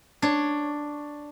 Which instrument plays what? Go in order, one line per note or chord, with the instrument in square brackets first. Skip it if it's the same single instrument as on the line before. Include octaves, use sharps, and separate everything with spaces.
[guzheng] D4 C#5